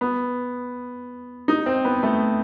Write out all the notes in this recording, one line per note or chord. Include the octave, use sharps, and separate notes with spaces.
B3
D#4
C4
B3
A3